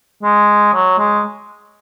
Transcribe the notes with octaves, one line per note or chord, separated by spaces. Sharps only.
G#3
F#3
G#3